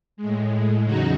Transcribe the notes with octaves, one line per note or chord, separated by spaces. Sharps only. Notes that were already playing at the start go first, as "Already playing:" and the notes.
A2 G#3
E2 C#3 F#3 D#4 F#4